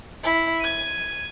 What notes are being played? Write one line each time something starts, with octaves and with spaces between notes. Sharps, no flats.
E4
G#6 D#7